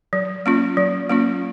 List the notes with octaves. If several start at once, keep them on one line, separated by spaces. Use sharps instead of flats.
F#3
A#3 C#4 F4
F#3
A#3 C#4 F4